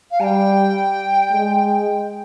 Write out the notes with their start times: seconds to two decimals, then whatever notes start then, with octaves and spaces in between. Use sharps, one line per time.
0.11 F5
0.20 G3 G5 A#5
1.31 G#3